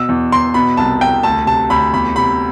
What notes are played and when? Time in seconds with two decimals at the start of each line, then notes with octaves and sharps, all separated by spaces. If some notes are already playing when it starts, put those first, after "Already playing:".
Already playing: B2 E6
0.09 E2
0.32 E2 C6
0.54 B2 B5
0.77 C2 A5
1.01 C2 G5
1.23 D2 A5
1.46 C3 A5
1.70 D2 B5
1.93 E2 B5
2.16 C3 B5